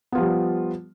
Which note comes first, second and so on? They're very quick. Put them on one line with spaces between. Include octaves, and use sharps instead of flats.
B3 F4 F3 G3